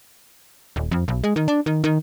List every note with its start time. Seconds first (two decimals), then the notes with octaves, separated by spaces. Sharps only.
0.76 D#1
0.91 F2
1.08 B1
1.24 G#3
1.36 D#3
1.48 D4
1.66 D#3
1.84 D#3